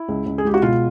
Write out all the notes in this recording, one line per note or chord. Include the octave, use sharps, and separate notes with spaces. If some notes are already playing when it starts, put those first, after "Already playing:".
Already playing: E4
C#2
C#2
G#4
G#3 G4
F#4
B2 F4